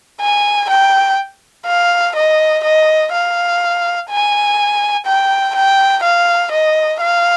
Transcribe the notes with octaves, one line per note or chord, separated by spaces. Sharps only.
G#5
G5
F5
D#5
D#5
F5
G#5
G5
G5
F5
D#5
F5